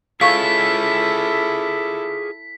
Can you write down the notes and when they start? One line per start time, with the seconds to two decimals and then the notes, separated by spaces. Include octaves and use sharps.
0.21 E4 F4 G#4 A4 C#5 F5 C#6 B6